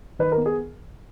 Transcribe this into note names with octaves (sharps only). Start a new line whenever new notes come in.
D#3 B4
A#4
B3
G#4